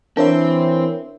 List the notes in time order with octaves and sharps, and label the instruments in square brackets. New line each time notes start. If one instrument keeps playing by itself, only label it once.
[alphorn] E3 [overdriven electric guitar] C4 [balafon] D4 [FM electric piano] A#4 C#5 E5